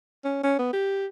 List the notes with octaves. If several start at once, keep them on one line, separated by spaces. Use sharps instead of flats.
C#4
C#4
B3
G4